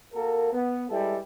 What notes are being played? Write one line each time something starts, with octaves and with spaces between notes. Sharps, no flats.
A#3 F#4 A4 A#4
B3
G3 G#3 E4 A4 B4